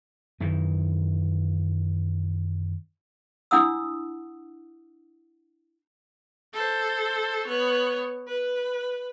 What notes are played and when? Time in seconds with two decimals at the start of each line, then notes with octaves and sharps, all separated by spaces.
0.40 F#2 D#3 E3
3.51 D4 E4 F#5 D#6 E6
6.53 A4 C5
7.47 B3 C#5
8.27 B4